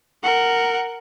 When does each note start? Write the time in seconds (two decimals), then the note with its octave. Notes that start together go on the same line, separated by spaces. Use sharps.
0.23 A#4 F#5